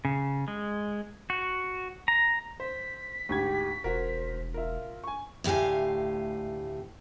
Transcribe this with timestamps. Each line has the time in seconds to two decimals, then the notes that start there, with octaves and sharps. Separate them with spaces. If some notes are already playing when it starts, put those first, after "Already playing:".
0.05 C#3
0.48 G#3
1.30 F#4
2.08 A#5
2.60 C5 B6
3.29 D2 G#2 G4 G#6
3.84 E1 F#4 A#4 C5
4.54 F4 A#4 E5
5.04 G#5 C#6
5.44 D2 A2 G4 F5 G#5